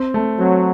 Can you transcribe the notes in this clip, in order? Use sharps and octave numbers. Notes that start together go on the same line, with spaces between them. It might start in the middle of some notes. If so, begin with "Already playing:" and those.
Already playing: C4
A3
F#3 C4